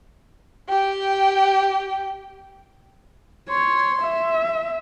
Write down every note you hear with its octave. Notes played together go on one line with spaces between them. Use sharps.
G4 G5
C#5 C6
E5